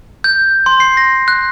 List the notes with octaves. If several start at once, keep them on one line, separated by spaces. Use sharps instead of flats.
G6
C6
C7
A#6
F#6